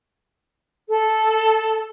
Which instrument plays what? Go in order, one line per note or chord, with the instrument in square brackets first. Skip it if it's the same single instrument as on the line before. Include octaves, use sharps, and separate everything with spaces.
[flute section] A4